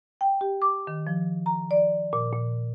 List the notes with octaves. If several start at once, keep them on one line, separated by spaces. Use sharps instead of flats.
G5
G4
D6
D#3
F3
A#5
D5
A#2
A#2